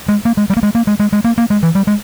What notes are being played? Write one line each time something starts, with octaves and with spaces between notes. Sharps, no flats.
G#3
A#3
G#3
G3
A#3
G#3
A#3
G#3
G#3
G#3
A#3
A#3
G#3
E3
G3
G#3